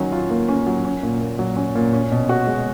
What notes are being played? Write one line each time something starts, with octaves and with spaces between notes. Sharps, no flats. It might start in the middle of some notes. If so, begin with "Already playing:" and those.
Already playing: D#3 F#3 C#4
F4
A#3
C#4
F#3
C#4
A#2
A#2
F#3
C#4
A#2
C#4
B2
F#4
G#3